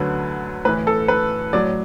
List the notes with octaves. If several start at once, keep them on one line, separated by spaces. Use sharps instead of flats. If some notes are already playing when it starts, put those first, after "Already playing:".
Already playing: D2 D3 F#3 B4
A2 E3 B4
A4
B4
A2 F#3 D5